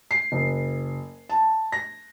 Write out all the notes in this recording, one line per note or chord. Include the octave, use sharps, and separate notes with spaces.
C7
F#1
A5
A#6